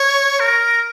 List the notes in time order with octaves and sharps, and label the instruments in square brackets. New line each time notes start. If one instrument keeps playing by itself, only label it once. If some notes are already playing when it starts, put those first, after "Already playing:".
Already playing: [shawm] C#5
A#4